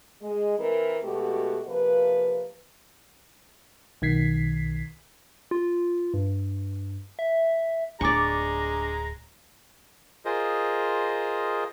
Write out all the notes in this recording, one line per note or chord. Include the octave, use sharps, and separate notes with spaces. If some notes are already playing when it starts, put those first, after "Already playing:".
G#3
E3 C4 A#4
B2 G#3 A3 F#4 G4
C3 F3 A#3 B4
B1 D#3 G#6 B6 C7
F4
G2
E5
D1 G#3 D4 D5 G#5 A#5 C#6 D6
F4 G#4 A#4 C5 D#5